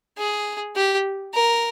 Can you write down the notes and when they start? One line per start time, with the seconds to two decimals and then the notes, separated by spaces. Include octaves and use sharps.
0.18 G#4
0.76 G4
1.34 A#4